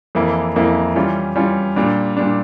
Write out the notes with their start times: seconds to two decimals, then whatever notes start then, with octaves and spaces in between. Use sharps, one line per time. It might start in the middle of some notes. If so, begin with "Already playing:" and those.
0.15 F2 E3 A#3 E4
0.56 F2 E3 A#3 E4
0.95 E3 G3 C#4 F4
1.36 E3 G3 C#4 F4
1.76 A#2 G3 D4
2.17 A#2 G3 D4